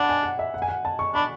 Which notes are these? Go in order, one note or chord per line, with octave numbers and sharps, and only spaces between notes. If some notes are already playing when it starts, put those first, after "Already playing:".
Already playing: D4 F#5 B5
G#5
F#5
E5
F#5
G#5
F#5
A5
C#6
D4 B5